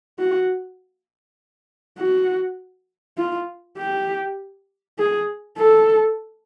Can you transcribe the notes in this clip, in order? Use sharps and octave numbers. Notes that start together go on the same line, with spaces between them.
F#4
F#4
F4
G4
G#4
A4